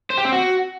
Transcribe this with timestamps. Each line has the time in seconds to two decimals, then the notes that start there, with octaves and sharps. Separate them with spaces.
0.10 C5
0.18 G4
0.25 C4
0.32 F#4